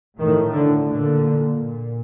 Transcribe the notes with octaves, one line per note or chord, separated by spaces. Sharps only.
A2 D#3
D3
A#2 D3
A#2